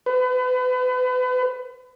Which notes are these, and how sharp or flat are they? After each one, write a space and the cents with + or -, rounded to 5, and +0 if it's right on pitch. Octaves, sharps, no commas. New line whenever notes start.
B4 +35